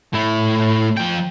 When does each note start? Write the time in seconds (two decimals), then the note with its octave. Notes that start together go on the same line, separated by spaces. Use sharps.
0.13 A2 E4
0.97 F3 G5